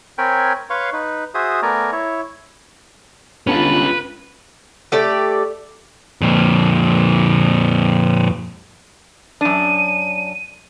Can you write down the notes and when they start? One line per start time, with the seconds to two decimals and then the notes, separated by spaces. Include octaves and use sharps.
0.18 C4 A#4 C#5 G5 G#5 B5
0.70 B4 C#5 F5 C6 C#6
0.93 D#4 B4
1.35 F#4 G#4 C5 E5 D#6
1.62 A3 B3 A#4 D5 G#5 A#5
1.92 E4 C#5
3.47 G1 C#4 F4 B4
4.92 A3 G4 D5
6.21 F2 A#2
9.41 F#2 D4 D#7